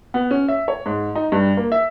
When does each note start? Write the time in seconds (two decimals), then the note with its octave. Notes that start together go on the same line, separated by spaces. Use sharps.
0.14 B3
0.31 C#4
0.48 E5
0.68 C#5
0.86 G#2
1.15 D#4
1.32 G2
1.57 A#3
1.72 E5